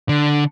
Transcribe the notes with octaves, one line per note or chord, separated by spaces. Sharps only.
D3